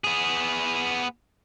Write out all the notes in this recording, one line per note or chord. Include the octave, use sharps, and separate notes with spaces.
B3 G#4